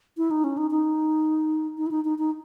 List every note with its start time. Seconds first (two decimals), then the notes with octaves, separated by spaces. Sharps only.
0.17 E4
0.31 D#4
0.44 C#4
0.57 D#4
0.71 D#4
1.78 D#4
1.86 E4
1.91 D#4
2.05 D#4
2.19 D#4